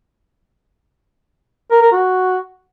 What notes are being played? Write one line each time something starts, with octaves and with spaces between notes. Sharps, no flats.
A#4
A#4
F#4